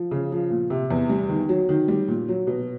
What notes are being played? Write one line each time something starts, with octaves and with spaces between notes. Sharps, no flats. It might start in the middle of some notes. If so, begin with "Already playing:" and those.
Already playing: F3
C#3
F3
A#2
C3
E2
G3
D#3
F#3
D#3
G3
A#2
F#3
B2